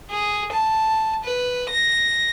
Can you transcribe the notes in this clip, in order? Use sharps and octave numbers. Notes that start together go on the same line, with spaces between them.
G#4
A5
B4
A#6